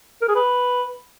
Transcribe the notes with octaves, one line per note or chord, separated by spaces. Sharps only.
A#4
G#4
B4